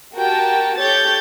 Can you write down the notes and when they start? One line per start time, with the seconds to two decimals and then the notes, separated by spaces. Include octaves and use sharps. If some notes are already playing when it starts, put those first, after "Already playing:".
0.16 F#4 G4 A#4 G5 A5
0.78 G4 A4 C#5 G6 A6